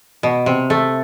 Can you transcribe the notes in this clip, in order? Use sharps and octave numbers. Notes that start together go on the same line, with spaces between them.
B2
C3
A3